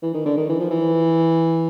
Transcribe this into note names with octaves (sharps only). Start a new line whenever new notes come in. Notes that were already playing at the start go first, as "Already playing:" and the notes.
E3
D#3
D3
D#3
E3
F3
E3